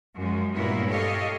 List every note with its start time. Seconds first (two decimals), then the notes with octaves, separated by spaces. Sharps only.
0.14 F#2 F3 G#3
0.53 G2 A#2 A#3 B3 E4 C#5
0.87 G4 A4 C#5 D#5 F5